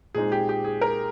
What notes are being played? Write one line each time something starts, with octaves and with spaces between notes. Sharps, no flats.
A#2 G#3 C4 D#4 G#4
G4
G4
G#4
A#4